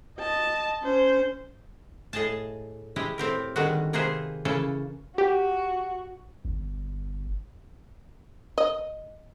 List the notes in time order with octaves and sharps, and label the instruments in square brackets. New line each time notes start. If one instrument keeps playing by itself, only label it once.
[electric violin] D#5 A5
C#4 C5
[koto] A2 G#4 D#5 G#5 A5
G#3 E4 G4 D#5
A2 C4 G4 A#4
D3 D#3 G3 G#3 F#4
C3 A#3 D#4 G#4 B4 C5
C#3 E3 A#3 C#4 A4
[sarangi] F#4 [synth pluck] G4
[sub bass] G1
[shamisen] D#5